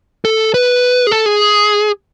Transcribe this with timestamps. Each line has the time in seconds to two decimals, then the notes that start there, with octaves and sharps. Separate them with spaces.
0.25 A4
0.54 B4
1.07 G#4
1.11 A4
1.26 G#4